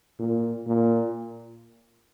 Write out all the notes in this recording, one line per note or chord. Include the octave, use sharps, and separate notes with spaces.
A#2
A#2